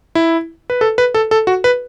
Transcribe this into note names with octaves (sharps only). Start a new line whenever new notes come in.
E4
B4
A4
B4
A4
A4
F#4
B4